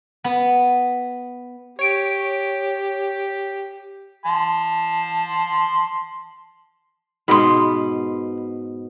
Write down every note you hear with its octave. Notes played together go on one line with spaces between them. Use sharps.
B3
G4 C#5 D7
A5 C6
G#2 B2 B3 B5 C6